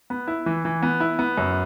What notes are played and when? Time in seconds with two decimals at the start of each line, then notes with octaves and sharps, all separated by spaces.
0.10 B3
0.27 E4
0.46 E3
0.65 E3
0.83 B3
1.00 E4
1.19 B3
1.38 F#2